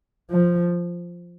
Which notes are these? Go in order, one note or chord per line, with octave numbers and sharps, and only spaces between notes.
F3